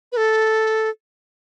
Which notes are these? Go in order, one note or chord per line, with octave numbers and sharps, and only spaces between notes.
B4
A4